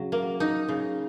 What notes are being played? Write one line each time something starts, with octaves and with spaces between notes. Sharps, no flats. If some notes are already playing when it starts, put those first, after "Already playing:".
Already playing: C#3 F#3
A#3
D#4
C#3